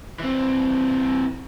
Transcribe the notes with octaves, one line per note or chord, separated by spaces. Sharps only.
E3 C4